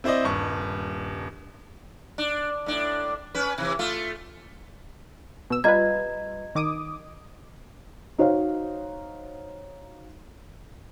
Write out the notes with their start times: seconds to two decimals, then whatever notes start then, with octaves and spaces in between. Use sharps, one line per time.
0.04 C4 E4 C5 D5 D#5
0.25 D#1 G2 C#6
2.18 D4
2.66 A2 D4
3.35 C#4 B4
3.58 C3 E3
3.79 A3 F4
5.50 B2 E6
5.64 G3 F4 B4 D#5 A#5 G#6
6.55 D#3 D6 D#6
8.18 D#4 F#4 C5 C#5 F5